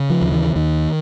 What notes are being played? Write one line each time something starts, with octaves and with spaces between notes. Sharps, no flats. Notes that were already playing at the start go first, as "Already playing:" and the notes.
Already playing: C#3
F3
D#2
E3
D#2 D#3